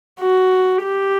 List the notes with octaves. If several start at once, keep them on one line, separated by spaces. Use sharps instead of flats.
F#4
G4